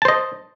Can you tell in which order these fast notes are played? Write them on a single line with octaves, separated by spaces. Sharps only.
A5 C5 D#5